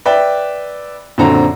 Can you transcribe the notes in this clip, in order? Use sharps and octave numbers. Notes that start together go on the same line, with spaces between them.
B4 D5 E5 G5
A#1 F#2 D3 C4 A4 A#5